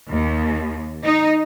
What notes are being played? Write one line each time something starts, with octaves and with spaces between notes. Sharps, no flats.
D#2
D#4